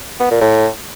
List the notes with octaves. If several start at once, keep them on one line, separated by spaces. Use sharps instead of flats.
B3
A#2
A2